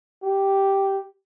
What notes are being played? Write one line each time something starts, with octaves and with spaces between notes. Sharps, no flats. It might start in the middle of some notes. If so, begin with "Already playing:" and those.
G4